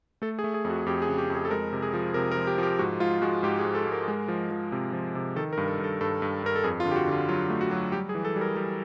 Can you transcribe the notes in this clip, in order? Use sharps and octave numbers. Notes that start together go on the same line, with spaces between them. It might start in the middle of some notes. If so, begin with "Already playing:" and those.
A3 A4
G#4
A3
G#4
F2
F#4
F2 G4
G#4
C#3
G4
F2
G#4
A4
G#3 A#4
C3
G#4
F3
C3 A#4
A#4
F3
G4
F3 G4
G#2 F#4
G#2 F4
G#3 F#4
G#2 G4
G#4
G#2
A4
G#2
A#4
G#3
F3
F3
C3
F3
C3
D#3 A4
A#4
G2
A4
G2 A4
G2 A4
G2
G2 A#4
A4
F2 G#4
F4
D3
G4
F#4
D3 F4
F#3 F4
A3
F#4
F#3
G3 G4
G#4
E3
A4
G3
A#4
G3